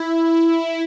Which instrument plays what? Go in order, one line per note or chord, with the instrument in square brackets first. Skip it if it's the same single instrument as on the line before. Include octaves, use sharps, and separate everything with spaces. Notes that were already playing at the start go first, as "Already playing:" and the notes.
Already playing: [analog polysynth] E4